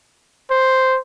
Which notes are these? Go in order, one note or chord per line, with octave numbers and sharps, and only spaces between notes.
C5